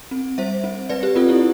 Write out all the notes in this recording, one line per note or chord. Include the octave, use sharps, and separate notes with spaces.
C4
G3 C5 E5
C4
G3 B4 D5
G4 B4
C4 F4 A4
E4 G4